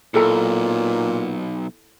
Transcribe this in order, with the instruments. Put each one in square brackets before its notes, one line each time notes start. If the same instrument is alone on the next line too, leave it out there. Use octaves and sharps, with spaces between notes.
[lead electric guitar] B1 [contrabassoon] A#2 [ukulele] E4 A4 A#5